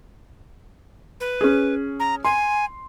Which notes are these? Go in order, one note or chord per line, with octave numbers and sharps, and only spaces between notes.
B4
C#4 G#4
A#5
G#5 C6